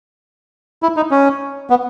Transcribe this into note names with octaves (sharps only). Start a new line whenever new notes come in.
E4
D#4
C#4
B3